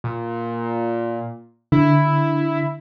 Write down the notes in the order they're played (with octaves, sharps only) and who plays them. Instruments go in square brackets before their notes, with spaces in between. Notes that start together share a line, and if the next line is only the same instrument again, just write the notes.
[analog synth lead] A#2
[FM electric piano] D3 [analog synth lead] E4